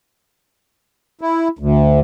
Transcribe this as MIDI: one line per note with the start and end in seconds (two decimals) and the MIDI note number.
1.21 1.48 64
1.59 2.00 38